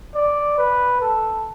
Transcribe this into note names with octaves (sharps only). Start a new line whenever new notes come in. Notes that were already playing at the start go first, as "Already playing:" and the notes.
D5
B4
A4